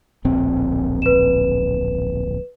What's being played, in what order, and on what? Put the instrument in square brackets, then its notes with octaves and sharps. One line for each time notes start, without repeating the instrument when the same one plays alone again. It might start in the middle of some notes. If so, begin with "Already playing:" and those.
[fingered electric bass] D1 A#1 C4
[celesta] B4 E7